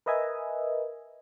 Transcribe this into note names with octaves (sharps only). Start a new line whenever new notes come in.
A#4 B4 D#5 E5 G#5